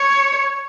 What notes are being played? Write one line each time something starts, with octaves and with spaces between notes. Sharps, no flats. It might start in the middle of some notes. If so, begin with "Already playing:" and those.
Already playing: C#5